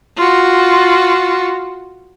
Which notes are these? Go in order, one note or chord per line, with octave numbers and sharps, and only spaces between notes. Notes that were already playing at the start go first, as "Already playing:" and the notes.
F4 F#4